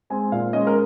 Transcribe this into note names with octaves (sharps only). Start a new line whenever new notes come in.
G#3 C4 G#5
A#2 F5
G#3 C#4 D#5
A#4